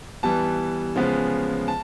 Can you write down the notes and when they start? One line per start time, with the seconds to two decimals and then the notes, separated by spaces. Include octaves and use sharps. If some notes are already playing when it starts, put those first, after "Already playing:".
0.23 E3 G3 B3 A5
0.96 C#3 F3 G#3 B3
1.68 A5